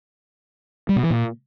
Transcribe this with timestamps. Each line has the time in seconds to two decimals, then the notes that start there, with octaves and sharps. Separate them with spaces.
0.89 G3
0.96 B2
1.03 E3
1.10 A#2